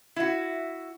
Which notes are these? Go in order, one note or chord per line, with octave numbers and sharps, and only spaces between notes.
E4 F#4